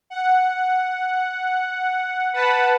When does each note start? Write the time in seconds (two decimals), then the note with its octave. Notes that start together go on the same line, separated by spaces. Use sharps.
0.10 F#5
2.33 B4 F#5 A5 B5